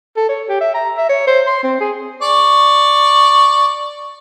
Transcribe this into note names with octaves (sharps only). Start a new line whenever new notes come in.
A4
C#5
G4
E5
A#5
E5
C#5
C5
C6
C4
G#4
D5 C#6